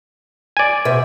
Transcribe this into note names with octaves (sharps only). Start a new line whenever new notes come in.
D5 G#5
B2 C5 E5